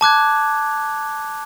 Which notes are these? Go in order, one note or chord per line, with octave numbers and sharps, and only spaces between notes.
A5 D6 F#6 G#6